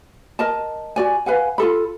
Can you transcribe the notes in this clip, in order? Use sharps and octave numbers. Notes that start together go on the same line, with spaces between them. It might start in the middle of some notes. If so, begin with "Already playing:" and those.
A#4 D#5 A5
F#4 D5 G#5
B4 F5 F#5 G#5
F4 G#4 A4 B5